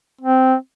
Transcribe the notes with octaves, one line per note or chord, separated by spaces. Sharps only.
C4